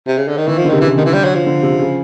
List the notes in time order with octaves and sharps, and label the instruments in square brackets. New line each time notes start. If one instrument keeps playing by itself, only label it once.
[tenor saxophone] C3
C#3
D3
D#3
[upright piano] D#3 [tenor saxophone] E3
[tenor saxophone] F3
[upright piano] D3
[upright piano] C3 [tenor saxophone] D#3
[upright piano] C#3 [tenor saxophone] E3
[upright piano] D3 [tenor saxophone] D#3
[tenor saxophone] E3
G3
F#3
F3
[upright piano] D3
C3
C3
C#3